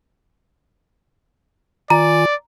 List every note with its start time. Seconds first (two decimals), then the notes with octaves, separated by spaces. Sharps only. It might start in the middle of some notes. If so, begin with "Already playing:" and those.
1.90 D#3 F4 D5 G#5 A#5